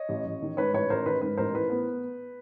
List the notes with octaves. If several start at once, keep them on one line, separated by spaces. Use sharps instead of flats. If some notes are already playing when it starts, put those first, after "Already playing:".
Already playing: C#5 D#5
A1
A1
D#3
G#2 B4 C#5
A1 B4 C#5
A1 A#4 C5
D#3 B4
G#2 B4
A1 A#4 C5
A2 B4
B3